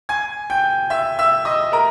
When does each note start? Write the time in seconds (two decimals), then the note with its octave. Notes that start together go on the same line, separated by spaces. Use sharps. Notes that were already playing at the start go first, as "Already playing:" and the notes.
0.09 G#5 G#6
0.50 G5 G6
0.90 E5 E6
1.19 E5 E6
1.45 D#5 D#6
1.72 A#4 A#5